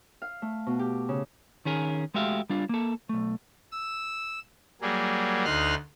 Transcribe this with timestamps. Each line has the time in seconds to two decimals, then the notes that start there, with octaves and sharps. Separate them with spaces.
0.22 F5
0.42 A3
0.67 B2
0.79 G4
1.09 C#3
1.65 D#3 C#4 G#4 A#4
2.14 G#3 A3 F#4 G4 E5 F5
2.50 G3 D4 F4
2.69 A#3 A4
3.09 B1 A3
3.72 E6
4.81 F#3 G3 A#3 G#4
5.45 D2 D#4 C6 F6 F#6